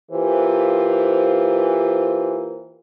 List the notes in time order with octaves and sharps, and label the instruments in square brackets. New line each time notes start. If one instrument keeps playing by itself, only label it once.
[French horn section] E3 A#3 F4 G4 C5